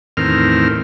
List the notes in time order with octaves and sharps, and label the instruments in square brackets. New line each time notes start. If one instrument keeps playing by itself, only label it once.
[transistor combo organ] E2 A2 D#3 C4 A#4 F6